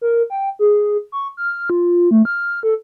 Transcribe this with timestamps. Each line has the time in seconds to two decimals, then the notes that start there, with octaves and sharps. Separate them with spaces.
0.01 A#4
0.30 G5
0.59 G#4
1.12 C#6
1.37 F6
1.70 F4
2.11 A3
2.25 F6
2.63 A4